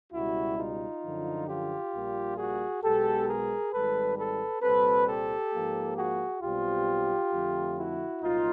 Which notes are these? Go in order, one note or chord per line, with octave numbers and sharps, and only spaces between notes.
C#2 B2 G3 E4 F#4
D#4 F4
F#2 D3 F3
F4 G4
A#1 A#2 G3 A#3
F#4 G#4
B1 B2 G#3 B3 G4 A4
G#4 A#4
G#1 G#2 D#3 G3 A4 B4
A4 B4
C2 A#2 G3 C4 A4 B4
G4 A4
G#2 F3 A#3
F#4 G#4
B1 B2 G3 C4 F4 G4
F2 D3 F3 A3
E4 F#4
C2 A#2 F#3 A#3 D#4 F4